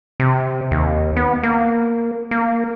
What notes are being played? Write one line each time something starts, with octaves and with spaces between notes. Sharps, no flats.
C3
D#2
B3
A#3
A#3